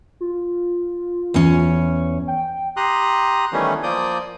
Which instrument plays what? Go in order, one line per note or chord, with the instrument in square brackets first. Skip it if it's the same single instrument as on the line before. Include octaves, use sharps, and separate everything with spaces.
[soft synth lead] F4
[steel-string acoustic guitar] E2 C#4
[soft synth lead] G5
[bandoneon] G4 A#5 C6 D#6 F#6
D#3 E3 G3 A3 B3 C#4
F3 A#3 D5 D#6 G6